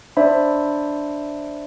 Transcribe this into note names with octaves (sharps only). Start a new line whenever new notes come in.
D4 C5 D5 E5 B5